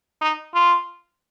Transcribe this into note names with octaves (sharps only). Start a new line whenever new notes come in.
D#4
F4